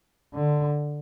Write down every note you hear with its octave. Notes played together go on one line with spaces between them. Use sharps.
D3